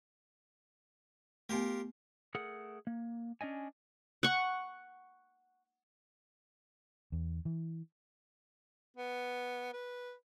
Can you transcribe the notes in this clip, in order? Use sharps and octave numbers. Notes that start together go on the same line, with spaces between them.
A3 B3 F4 G4 A#4
A3 G#4 A#4 F#5
A#3
C#4 D4 D#5 G#5
F#5 C#6
E2
E3
B3
B4